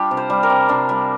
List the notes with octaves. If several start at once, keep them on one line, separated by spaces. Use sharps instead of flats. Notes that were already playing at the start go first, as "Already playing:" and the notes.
Already playing: G3 D4 F4 G4
C3
C5
G3
A#4
C3
C3 D4
G3